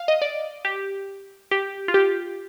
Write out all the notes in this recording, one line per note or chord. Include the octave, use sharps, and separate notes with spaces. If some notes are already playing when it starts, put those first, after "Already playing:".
Already playing: F5
D#5
D5
G4
G4
F4
G4